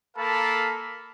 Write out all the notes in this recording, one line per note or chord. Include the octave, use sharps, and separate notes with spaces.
A#3 A4 A#4 F5 A5 B5